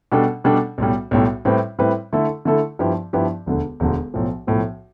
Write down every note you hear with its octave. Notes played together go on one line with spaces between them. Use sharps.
B2 G3 D4 A4
B2 G3 D4 A4
B1 A2 G3
B1 A2 G3
A2 G3 C4 E4 B4
A2 G3 C4 E4 B4
D3 A3 E4 A4
D3 A3 E4 A4
G2 F3 B3 E4 G4
G2 F3 B3 E4 G4
E1 D2 D3
E1 D2 D3
B1 A2 F3
B1 A2 F3